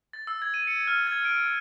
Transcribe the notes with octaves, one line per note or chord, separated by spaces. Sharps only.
A6
E6
G#6
D#7
C#7
F6
G#6
D7